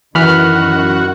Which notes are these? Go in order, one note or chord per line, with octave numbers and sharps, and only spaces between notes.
F#2 D#3 E3 F#4 B5 F6